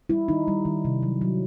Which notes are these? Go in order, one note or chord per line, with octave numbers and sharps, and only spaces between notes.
G3 E4
D#3 D#4
G3
D#3
C3
F#3
F#3